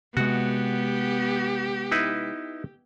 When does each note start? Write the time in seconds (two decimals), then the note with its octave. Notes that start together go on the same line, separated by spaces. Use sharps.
0.17 C3 G#3 B3 F#4 G4
1.92 D#4 E4 B4